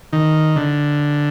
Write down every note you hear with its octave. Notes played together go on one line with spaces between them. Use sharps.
D#3
D3